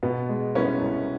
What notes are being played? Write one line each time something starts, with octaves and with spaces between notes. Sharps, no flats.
B2 B3
G#3
C2 B3 C#4
C2